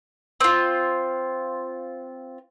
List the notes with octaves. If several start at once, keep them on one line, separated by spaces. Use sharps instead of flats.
C4 F4